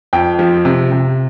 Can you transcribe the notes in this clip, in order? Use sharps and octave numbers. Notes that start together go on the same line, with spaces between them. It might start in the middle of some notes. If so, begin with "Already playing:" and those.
F2 G5
F3
C3
C3